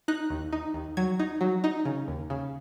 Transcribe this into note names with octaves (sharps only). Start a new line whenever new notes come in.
D#4 F#6
D#2
D#4
D#2
F#3 G#6
D#4
F#3
D#4
C#3
D#2
C#3